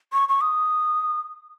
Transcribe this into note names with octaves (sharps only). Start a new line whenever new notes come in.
C#6
C#6
D#6